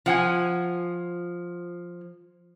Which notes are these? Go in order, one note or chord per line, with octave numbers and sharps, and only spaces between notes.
F3 F#5 G#5